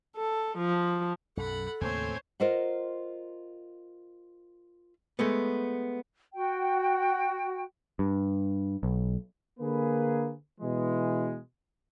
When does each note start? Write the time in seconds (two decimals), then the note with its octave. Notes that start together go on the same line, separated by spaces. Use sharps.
0.16 A4
0.57 F3
1.37 B1 F#2 A4 F#5 B5
1.81 D#2 A2 C#3 A#3 C4 C5 C#5 G#5
2.40 F4 A#4 C5 D#5 F#5
5.19 G#3 A3 B3
6.34 F#4 G5
7.99 G2
8.83 B1
9.60 D3 A#3 G#4 B4
10.60 B2 E3 G#3